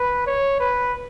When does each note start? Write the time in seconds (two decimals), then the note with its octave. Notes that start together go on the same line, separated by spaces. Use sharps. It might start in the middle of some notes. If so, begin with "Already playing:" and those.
Already playing: B4
0.27 C#5
0.60 B4